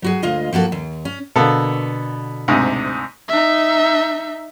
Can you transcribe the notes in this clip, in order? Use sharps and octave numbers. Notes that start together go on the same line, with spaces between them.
F#3 F#4 G#4
D2 G#3 F4 D#5 F5
F3 A#3 F#4 A4
D#2
C#4
B2 D3 A#3 B3 A4
D2 G#2 C3
D#4 E5